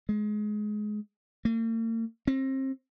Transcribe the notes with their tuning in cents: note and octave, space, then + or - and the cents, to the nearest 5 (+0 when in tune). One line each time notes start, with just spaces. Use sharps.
G#3 +20
A#3 -45
C4 +30